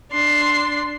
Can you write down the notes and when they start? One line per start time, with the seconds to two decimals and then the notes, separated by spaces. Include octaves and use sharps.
0.11 D4 C6